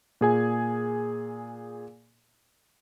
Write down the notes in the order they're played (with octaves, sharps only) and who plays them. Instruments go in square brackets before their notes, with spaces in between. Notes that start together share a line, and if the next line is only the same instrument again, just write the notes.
[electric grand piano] A#2 G#4 G#5